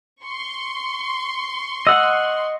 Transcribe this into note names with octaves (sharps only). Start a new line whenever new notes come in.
C6 C#6
D#5 F#5 E6